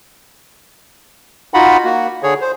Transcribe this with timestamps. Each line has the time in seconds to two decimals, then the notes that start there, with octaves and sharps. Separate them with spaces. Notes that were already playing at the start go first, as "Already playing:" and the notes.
1.54 D#4 F4 F#4 F#5 B5
1.84 A#3 F#4
2.23 D3 G#4 C#5
2.41 C5